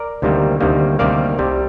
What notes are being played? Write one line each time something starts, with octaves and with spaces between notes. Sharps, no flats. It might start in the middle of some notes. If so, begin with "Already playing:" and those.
Already playing: A#4 D5
D2 C3 D#3 G3 A#3
D2 C3 D#3 G3 A#3
D2 C3 D#3 G3 A#3 D5 F5
C2 C3 G3